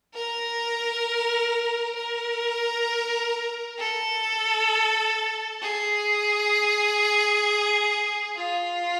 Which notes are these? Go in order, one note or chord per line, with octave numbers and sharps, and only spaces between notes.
A#4
A#4
A4
G#4
F4